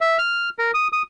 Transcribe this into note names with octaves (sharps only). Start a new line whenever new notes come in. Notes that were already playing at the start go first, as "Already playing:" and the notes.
E5
F6
A#4
D#6
D#6